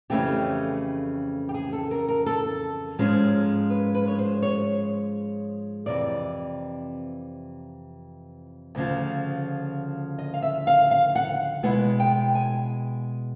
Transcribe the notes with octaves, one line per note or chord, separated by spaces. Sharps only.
F2 C#3 E3 A3 C#4 G4
G4
G#4
A4
A#4
A#4
A4
G#2 F3 G#3 C#4
B4
B4
C#5
C5
C#5
F2 C3 E3 D5
D2 C#3 F3
D#5
F5
E5
F5
F5
F#5
B2 G#3 B3 E4 F#5
G5
G#5